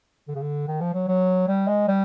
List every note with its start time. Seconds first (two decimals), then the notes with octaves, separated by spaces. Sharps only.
0.28 D3
0.35 C#3
0.42 D3
0.68 D#3
0.81 F3
0.94 F#3
1.08 F#3
1.48 G3
1.68 G#3
1.88 G3